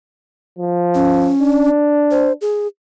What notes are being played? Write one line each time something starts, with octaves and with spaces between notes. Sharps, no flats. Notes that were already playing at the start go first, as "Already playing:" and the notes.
F3
C#4
D4
C5
G#4